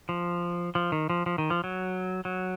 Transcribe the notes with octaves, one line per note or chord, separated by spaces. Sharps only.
F3
F3
D#3
F3
F3
D#3
F3
F#3
F#3